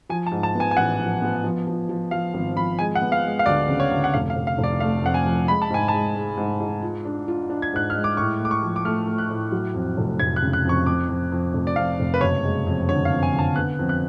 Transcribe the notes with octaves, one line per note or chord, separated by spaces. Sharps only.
F3 G#5
A5
G#2
A5
B3
G#5
G#5
A1 F#5
F3
B3
F3
F3
F3
F3 F5
G#1
F3 B5
G#3 G#5
F#5
B3
F5
G#3
F5
D2 D5
C#3
C#5
D2
F#5
F1 F5
F5
F1
F5
F1
D5
A3 F5
F2 F#5
G#5
F3
G#3 B5
A5
G#2 G#5
G#3 A5
G#3
G#2
G#2
F4
D4
F4
D4
G#6
G#2 F#6
G#3 F6
D6
A2 C#6
A3
D6
C#6
F3
D6
A3 F6
A3
F#6
A2
F#3
F2
F1
F1 G#6
F#6
C#3
F#6
F2 C#6
F2 D6
F2
F2
F1
D5
F2 F5
F1
B4
F#1 C#5
G#3
F2
D3 C#5
F5
F2
G#5
D3
A5
B3 F#6
F2
F#6